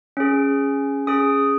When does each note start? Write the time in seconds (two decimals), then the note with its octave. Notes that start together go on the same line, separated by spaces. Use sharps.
0.17 C#4 G#4
1.07 C#4 G#4 D#6